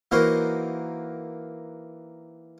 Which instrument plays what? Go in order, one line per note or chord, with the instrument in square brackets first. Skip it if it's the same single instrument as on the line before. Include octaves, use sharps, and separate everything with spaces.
[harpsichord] E3 A#3 D#4 F#4 A#4 C5